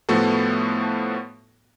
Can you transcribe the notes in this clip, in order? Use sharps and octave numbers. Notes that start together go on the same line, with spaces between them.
A2 F3 A3 B3 F#4 A4